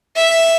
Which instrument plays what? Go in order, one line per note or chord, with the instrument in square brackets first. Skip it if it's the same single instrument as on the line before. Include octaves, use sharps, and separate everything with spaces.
[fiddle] E5